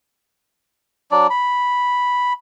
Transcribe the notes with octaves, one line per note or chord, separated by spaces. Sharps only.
F#3 D4 D5
B5